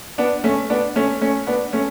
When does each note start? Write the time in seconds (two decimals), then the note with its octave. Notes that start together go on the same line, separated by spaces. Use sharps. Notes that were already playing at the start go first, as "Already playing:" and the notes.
0.18 B3 D4
0.44 A3 C#4
0.70 B3 D4
0.96 A3 C#4
1.21 A3 C#4
1.47 B3 D4
1.73 A3 C#4